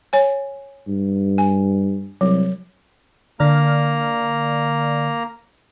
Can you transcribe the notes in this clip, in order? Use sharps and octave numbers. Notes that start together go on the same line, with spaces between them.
C#5 G#5
G2
G#5
C2 F#3
D3 A#3 D5 A#5 F6